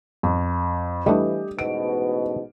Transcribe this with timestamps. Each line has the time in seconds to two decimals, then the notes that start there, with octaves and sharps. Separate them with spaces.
0.23 F2
1.06 E3 G3 A3 D4 G4 D#5
1.59 A1 G#2 B2 D7